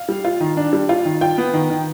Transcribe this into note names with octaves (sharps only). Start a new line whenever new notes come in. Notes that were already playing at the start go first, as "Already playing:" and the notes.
Already playing: F5
G3
F4
D#3
D4
G3
F4
D#3
F4 G5
B3
D#3
D#3